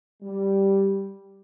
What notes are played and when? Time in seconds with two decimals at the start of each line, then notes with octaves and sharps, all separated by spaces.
0.22 G3